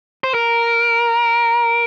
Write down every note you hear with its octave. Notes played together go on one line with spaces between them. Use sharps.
C5
A#4